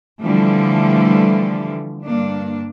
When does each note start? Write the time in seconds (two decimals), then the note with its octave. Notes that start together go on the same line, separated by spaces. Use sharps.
0.22 D3 E3 F3 G3 A3
2.05 G2 A#3 D4